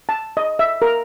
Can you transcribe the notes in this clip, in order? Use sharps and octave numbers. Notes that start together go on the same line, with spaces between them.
A5
D#5
E5
A#4